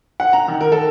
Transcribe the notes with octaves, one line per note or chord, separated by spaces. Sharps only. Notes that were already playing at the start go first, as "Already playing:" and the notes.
F#5
A#5
D#3
A#4
A4